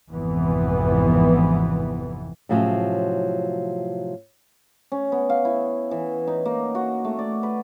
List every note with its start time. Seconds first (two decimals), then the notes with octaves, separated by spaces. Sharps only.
0.11 G#1 F2 C3 E3 B3
2.49 A2 C3 F3 F#3 C#4
4.92 C#4
5.12 B3
5.30 F5
5.45 E4
5.91 E3
6.27 D#4
6.45 A#3
6.75 F#4
7.05 A3
7.19 D5
7.43 B4